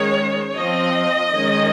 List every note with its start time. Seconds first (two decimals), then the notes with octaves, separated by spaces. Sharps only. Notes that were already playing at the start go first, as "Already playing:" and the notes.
Already playing: D#3 G#3 C#4 C#5
0.53 F3 C4 D#5
1.33 D#3 G#3 C#4